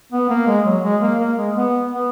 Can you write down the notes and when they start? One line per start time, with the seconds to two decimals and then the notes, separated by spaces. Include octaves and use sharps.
0.13 B3
0.30 A#3
0.47 G#3
0.66 F#3
0.83 G#3
1.02 A#3
1.19 A#3
1.38 G#3
1.55 B3
1.92 B3